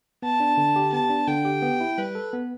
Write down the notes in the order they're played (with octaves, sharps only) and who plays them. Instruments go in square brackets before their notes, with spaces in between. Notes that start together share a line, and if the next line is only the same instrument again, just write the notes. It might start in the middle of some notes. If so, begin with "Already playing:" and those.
[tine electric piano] B3 [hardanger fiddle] A5
[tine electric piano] D4
D3
G4
[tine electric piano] B3 [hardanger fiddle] A5
[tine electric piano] D4
[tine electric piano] D3 [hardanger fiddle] G5
[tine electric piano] G4
B3
E4
[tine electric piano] G3 [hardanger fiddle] B4
[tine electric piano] A4
B3